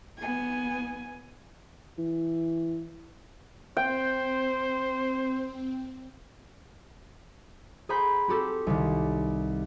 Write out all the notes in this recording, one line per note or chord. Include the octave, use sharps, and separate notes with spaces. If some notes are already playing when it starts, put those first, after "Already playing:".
B3 G#5
E3
C4 C5 G5
G#4 C5 F#5 A#5 B5 G6
C4 F#4 G4 A4
C2 D#3